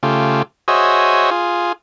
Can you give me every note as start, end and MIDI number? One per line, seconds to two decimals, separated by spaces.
0.03 0.42 49
0.03 0.42 57
0.03 0.42 65
0.03 0.42 67
0.68 1.30 66
0.68 1.30 68
0.68 1.30 72
0.68 1.30 73
0.68 1.30 75
0.68 1.30 76
1.31 1.72 65
1.31 1.72 68